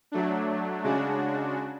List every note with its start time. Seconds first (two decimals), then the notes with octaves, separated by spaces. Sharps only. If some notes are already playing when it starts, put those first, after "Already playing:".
0.12 F#3 A3 D4
0.83 C#3 G#3 D4 F#4